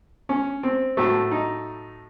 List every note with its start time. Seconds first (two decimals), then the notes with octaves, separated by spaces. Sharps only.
0.29 C#4
0.63 C4
0.97 A2 F#3 A3
1.31 D#4